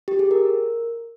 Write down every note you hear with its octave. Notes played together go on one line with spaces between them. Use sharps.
G4
G#4
A#4